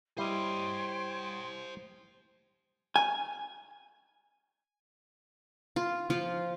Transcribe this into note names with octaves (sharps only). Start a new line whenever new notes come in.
G3 E4 C5 C#5 D#5 G5 C6
G#5
F4
F3 F4